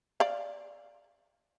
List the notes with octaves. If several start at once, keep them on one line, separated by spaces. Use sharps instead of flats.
D5 F5